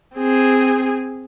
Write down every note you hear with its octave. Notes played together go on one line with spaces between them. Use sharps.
C4 G#4